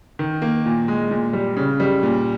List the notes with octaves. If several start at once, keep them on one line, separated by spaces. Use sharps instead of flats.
D#3
A#3
A#2
G#3
A#2
G3
C#3
G3
A#2